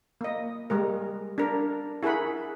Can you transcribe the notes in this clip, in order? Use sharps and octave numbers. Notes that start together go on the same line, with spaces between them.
A#3 D#5
G3 G#3 A#4
D4 A#4
E4 G#4 A#4 F#5 B5